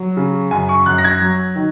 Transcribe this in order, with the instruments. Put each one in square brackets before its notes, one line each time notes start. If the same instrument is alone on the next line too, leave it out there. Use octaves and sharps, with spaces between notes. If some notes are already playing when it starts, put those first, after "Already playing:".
Already playing: [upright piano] F#3
C#3
F#2 G#5
C#6
F#2 F#6
A#6
G#6
F#3
D#3